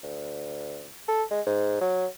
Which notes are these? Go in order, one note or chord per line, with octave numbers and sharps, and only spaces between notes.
D2
A4
G#3
G#2
F#3